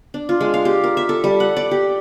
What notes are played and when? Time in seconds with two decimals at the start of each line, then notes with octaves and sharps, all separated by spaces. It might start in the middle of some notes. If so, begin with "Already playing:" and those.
0.14 D4
0.29 F4
0.41 G#3
0.54 F5
0.65 G4
0.84 A#4
0.97 E5
1.09 A4
1.24 G3
1.40 F#5
1.57 D5
1.71 G4